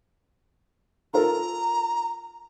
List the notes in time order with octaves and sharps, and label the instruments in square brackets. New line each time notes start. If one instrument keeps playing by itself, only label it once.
[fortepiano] F4 A4 A#4 [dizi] A#5